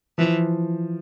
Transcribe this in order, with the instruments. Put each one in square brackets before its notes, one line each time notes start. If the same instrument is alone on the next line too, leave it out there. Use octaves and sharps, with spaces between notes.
[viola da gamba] E3 [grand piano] F3